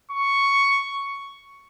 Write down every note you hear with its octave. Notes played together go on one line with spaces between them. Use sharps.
C#6